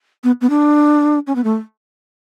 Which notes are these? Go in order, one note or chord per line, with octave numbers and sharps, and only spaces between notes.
B3
B3
D4
C#4
B3
A3